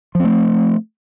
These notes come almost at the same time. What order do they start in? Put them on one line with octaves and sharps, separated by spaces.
F3 C4 A3